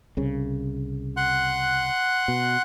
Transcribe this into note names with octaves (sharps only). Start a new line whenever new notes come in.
C2 C#3
F#5 C6 F#6
B2